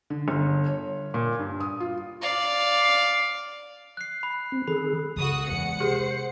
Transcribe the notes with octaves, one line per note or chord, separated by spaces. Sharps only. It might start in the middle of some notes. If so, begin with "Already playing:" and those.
D3
G1
C#5
A#2
G2
D#6
F4
D5 F5
F#6 C7
B5
C4
D#3 G#4 A4 B5
C#2 F#4 D#6
E2 G#3 F#5 C#7
C3 G4 G#4 C5